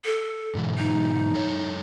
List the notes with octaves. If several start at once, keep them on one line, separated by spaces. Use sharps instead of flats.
A4
G#2 B2 E3
D#4
F#2 A4 C#5